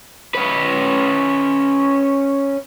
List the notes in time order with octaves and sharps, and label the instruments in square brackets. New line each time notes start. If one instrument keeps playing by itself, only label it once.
[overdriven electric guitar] C#4 B4